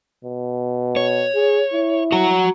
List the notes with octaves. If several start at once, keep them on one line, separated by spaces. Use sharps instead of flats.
B2
C#5
G#4
E4
F#4 F#5 A#5